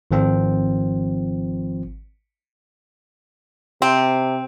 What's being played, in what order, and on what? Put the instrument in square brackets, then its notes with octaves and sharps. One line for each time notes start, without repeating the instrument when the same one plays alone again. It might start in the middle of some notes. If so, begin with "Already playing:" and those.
[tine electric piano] G#1 D#3 F3 C4 F4
[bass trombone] C3 [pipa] C4